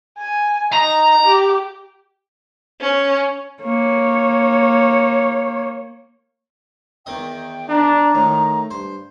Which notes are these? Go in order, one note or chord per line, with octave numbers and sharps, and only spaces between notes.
G#5
D#4 A#5
G4
C#4
A#3 C#5
E2 D#3 D#5 G5
D4 A#5
A2 D#3
G2 C5